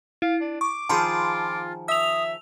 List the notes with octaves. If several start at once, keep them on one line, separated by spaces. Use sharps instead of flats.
E4 F5
D4
C#6 D6
D#3 F3 F4 G#4 A5 B5 C6
E5 D#6 E6 F7